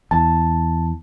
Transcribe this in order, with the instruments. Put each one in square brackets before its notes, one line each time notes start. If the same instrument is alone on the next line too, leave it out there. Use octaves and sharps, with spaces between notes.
[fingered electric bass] E2 [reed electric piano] A5